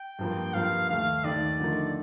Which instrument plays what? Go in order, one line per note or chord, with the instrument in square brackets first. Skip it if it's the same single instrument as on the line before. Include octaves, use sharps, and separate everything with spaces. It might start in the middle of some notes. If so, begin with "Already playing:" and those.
Already playing: [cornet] G5
[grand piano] G2 F3 A#3
[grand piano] G2 F3 A#3 [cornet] F5
[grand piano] D#2 D#3 A3 [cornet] F5
[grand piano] D#2 D#3 A3 [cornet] D5
[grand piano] D3 F3 A3 D#4 A#4